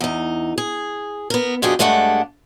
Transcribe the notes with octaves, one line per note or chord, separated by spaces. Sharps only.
E2 D#4
G#4
B3 A#4
F2 B2 D4 G4 G#4
G2 G#3 A3 D4 A#4 F#5